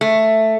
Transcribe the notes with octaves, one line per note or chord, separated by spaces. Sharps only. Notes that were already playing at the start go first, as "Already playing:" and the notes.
A3